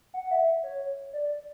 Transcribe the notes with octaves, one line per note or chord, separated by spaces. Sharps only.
F#5
E5
C#5
D5